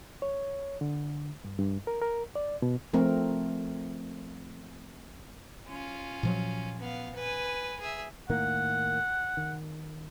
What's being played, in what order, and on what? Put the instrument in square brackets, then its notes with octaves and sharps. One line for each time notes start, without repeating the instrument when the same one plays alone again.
[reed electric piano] C#5
D3
G2
G2
A#4
A#4
D5
B2
[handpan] F3 A3 C4 A#4
[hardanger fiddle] C#4 F4
[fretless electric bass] A#2 F3 F#3
[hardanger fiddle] B3 F5
B4 G#5
G#4 E5
[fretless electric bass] A2 D#3 A#3 [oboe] F#5
[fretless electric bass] D#3